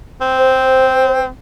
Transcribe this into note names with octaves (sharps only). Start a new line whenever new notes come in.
C4
C5